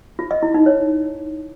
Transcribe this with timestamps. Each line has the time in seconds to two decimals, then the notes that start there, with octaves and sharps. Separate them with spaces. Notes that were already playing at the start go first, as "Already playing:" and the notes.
0.19 F4
0.31 D#5
0.43 E4
0.54 D#4
0.66 C#5